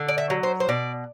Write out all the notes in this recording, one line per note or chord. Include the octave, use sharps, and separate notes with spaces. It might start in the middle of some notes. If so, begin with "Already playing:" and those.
Already playing: D3
D5
E5
F#3
C5
C5
B2 D5